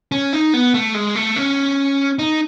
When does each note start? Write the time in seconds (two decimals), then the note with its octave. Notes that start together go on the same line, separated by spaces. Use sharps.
0.12 C#4
0.33 D#4
0.54 B3
0.74 A3
0.94 G#3
1.15 A3
1.36 C#4
2.19 D#4